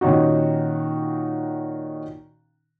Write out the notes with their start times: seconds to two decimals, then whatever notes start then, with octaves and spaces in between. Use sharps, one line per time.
0.01 A#2 D#3 C#4 D#4 F#4